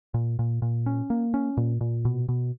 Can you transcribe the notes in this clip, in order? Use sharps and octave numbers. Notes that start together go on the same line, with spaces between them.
A#2
A#2
A#2
C#4
A#3
C#4
A#2
A#2
B2
B2